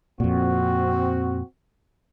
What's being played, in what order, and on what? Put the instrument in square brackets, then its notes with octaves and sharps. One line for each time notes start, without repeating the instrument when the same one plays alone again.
[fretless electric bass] F2 A#2 [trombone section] C4 F#4